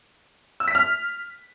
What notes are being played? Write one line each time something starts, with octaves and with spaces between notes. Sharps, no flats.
E6
B6
F6